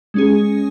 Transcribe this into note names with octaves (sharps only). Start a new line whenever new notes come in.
G#3 C#4 G#4